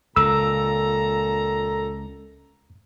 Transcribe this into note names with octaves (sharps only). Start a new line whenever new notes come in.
C#2 A#2 A4 A#5 E6